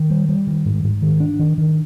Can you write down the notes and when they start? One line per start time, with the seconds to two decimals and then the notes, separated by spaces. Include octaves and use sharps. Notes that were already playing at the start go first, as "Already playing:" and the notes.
Already playing: D#3
0.10 G3
0.29 G3
0.47 D#3
0.66 G#2
0.84 G#2
1.02 D#3
1.20 D4
1.39 D#3
1.58 D#3